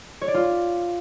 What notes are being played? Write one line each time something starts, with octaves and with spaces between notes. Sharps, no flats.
C#5
D5
F4